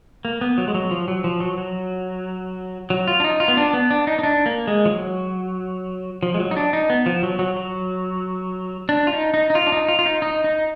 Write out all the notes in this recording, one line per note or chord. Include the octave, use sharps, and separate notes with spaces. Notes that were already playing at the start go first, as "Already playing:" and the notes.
A#3
B3
F#3
G#3
F#3
F3
F#3
F3
F#3
F#3
F#3
F4
D4
D#4
F4
B3
D4
B3
D4
D#4
D#4
D4
A#3
G#3
F3
F#3
F3
G#3
F#3
D#4
D4
D#4
B3
F3
F#3
F#3
F#3
D4
F4
D#4
D#4
D#4
F4
D4
D#4
F4
F4
D#4
D#4
D#4